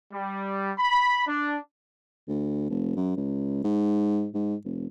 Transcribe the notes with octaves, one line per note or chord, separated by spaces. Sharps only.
G3
B5
D4
D2
F1
F#2
C#2
G#2
G#2
F1